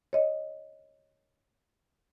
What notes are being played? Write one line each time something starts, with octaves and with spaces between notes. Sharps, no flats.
C#5 D#5